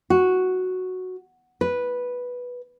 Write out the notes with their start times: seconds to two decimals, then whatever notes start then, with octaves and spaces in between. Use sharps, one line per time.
0.10 F#4
1.61 B4